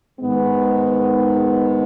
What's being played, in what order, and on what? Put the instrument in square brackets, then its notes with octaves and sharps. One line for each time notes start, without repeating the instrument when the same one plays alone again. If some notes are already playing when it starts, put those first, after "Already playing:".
[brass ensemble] G#2 D#3 G#3 B3